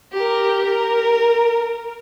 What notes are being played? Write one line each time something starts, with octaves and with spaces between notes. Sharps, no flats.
G4 A#4
A#4